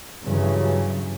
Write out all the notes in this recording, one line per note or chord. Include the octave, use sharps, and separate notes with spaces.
G2 C#3 E3 F#3